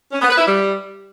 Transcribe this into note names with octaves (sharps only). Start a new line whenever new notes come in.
C#4
B3
B4
E4
G3